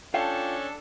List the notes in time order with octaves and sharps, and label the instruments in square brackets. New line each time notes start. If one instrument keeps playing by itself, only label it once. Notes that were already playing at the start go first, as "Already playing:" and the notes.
[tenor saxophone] C#4 [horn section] D4 A4 [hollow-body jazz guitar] F4 F5 [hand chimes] G5